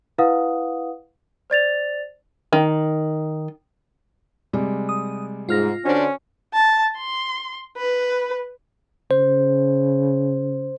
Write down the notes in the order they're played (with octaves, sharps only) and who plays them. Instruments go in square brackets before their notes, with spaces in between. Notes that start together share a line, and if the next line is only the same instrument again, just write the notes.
[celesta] E4 B4 F5 F#5 D#6
C5 D5 A6 F7
[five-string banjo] D#3
[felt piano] C3 G3 G#3
[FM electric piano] D#6
[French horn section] G#2 [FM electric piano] F4 F6 A#6
[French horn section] D3 D4 C5 [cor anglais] C#4 [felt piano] F#4
[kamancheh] A5
C6
B4
[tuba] C#3 [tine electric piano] C5